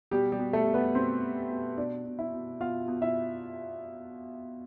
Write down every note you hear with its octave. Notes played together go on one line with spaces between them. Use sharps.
B2 G3 G4
G3 G4
B2
A3 A4
B2
B3 B4
B2 C4 C5
B2
B2
B2 D4 D5
B2
E4 E5
B2
B2 F4 F5
B2
E4 E5